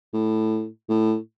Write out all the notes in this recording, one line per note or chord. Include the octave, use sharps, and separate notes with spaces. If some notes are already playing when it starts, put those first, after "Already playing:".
A2
A2